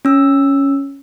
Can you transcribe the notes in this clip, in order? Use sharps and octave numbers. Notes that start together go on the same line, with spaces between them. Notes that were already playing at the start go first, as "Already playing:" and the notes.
C#4 E6